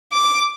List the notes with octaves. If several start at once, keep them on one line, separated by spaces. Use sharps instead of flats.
D6